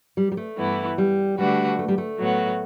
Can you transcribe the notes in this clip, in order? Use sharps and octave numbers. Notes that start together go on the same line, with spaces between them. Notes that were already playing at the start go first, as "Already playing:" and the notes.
G3
G3
A3
G2 E3 B3 E4
G3
D3 G3 A3 D4 F#4 B4
A3
G3
A3
A2 F#3 B3 F#4